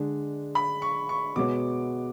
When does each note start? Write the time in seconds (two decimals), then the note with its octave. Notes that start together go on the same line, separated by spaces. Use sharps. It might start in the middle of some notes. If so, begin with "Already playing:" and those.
Already playing: D3 G#3 D4
0.55 B5
0.82 C#6
1.09 C#6
1.36 B2 G#3 B3 F#4 C#5 D6